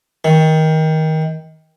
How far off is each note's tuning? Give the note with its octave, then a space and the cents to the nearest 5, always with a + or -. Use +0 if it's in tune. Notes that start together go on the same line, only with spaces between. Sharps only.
D#3 +20